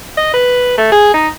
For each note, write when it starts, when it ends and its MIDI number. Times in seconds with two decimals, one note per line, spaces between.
0.17 0.30 75
0.34 0.76 71
0.78 0.89 57
0.92 1.13 68
1.14 1.28 63